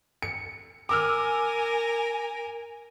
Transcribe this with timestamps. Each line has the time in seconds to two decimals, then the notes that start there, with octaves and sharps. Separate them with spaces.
0.22 C#7
0.89 A#4 G#5 D6 E6 F6